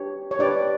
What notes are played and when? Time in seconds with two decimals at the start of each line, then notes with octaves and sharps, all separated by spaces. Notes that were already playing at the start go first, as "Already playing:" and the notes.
Already playing: D4 G4 B4 C#5
0.31 C#5
0.39 D4 G4 B4 D5